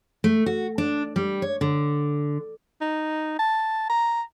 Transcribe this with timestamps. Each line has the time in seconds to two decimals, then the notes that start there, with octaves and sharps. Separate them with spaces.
0.24 A3
0.46 F#4
0.78 D4
1.16 G3
1.42 C#5
1.61 D3
2.81 D#4
3.39 A5
3.89 A#5